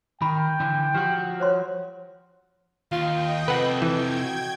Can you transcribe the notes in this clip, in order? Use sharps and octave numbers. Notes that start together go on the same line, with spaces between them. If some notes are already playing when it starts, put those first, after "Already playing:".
D#3 G5 B5
D3 E3
F3 F#4 G4
C5 C#5 C6
D#2 F4 D#5 G5
C3 F3 A4 B4 F#5
E3 G5 G#6
F#4